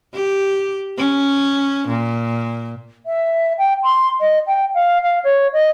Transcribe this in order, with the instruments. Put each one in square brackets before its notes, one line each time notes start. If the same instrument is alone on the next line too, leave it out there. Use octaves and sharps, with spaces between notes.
[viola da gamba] G4
C#4
A#2
[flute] E5
G5
C6
D#5
G5
F5
F5
C#5
D#5